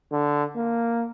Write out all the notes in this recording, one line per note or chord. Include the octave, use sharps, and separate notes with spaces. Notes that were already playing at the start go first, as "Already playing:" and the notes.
D3
A#3